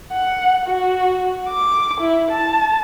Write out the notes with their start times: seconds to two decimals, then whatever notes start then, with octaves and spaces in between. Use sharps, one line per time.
0.12 F#5
0.67 F#4
1.49 D6
2.01 E4
2.31 A5